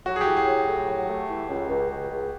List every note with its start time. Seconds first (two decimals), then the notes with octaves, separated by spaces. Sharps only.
0.06 F#3 F#4
0.16 G#4
0.21 G4
0.26 A2
0.37 G#4
0.47 F#3
0.67 A2
0.87 F#3
1.08 A3
1.28 E3
1.48 C#2
1.69 C#2
1.90 C#2
2.10 C#2